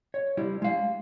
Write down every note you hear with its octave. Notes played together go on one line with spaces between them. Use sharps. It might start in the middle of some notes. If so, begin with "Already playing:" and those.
C#5
G3 E4
G#3 F5